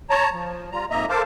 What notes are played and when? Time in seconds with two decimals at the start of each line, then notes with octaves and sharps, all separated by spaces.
0.10 C#5 A5 A#5
0.32 F3
0.72 G3 F4 A#5
0.90 F2 G#2 A#3 D#5 E5 A#5
1.09 A4 A#4 C5 F5 A5 D6